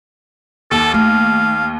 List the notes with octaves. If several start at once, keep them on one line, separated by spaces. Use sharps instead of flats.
D#2 A4
A3 F5